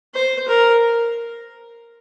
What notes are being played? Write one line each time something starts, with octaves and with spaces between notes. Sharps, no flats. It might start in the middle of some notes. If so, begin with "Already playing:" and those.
C5
A#4